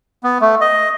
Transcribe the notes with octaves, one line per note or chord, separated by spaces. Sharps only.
B3
A3
D#5